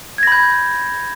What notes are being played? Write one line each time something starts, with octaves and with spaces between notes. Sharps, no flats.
B5 G6 G#6 A#6